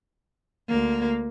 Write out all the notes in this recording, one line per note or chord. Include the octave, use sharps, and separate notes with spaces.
D2 A#3